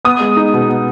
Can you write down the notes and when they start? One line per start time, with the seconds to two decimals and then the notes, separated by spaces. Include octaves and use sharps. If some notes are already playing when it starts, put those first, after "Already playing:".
0.05 B3 D#6
0.21 G#3
0.37 D#4
0.54 B2
0.69 B3